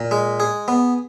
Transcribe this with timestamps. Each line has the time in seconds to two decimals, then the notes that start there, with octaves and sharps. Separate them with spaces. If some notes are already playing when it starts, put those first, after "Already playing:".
Already playing: A#2
0.11 G#3
0.40 G#4
0.68 B3